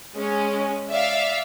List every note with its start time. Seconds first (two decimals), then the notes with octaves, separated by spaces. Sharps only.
0.16 G#3 C#4
0.90 D5 E5 F5